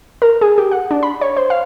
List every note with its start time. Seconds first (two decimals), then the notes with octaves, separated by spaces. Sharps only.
0.22 A#4
0.41 G#4
0.58 G4
0.71 F#5
0.91 D4
1.03 B5
1.21 C#5
1.37 C5
1.50 F5